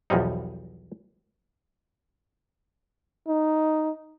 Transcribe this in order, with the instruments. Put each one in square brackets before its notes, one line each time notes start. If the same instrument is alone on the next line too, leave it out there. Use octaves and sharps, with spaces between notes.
[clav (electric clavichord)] B1 E2 F3 G3 D#4
[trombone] D#4